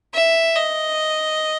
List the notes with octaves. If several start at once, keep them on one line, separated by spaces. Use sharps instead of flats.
E5
D#5